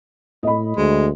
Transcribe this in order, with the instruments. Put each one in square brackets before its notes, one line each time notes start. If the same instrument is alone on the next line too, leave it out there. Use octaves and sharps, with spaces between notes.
[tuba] A2 [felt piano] D#5 B5
[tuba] D2 [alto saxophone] G#3